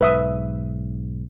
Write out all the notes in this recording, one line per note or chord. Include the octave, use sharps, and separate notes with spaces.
B1 G#2 B4 E5 D#6